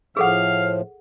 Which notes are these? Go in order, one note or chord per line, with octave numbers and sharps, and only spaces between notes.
A2 F3 G#4 A4 F5 F#5